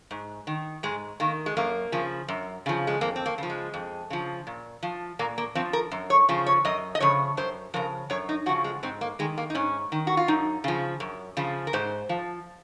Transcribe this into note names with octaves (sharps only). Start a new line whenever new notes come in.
G#2
D#3
G#2 G#3
D#3 A#3
G#3
F#2 A#3
C#3 F3
F#2
C#3 F3
G#3
F2 A#3
C4
A#3
C#3 F3
G#3
F2
C#3 F3
A#2
F3
A#2 A#3
A#3
F3 C4
A#4
F#2
C#5
C#3 F3
C#5
F#2 D#5
D#5
C#3 F3 C#5
F#2 C5
C#3 F3 A#4
F#2 C#5
D#4
C#3 F3 F#4
G#3
G#2 C4
A#3
D#3 G#3
A#3
D#4
G#2 C#4
D#3
F#4
F4
F#2 D#4
C#3 F3
F#2
C#3 F3
A#4
G#2 C5
F3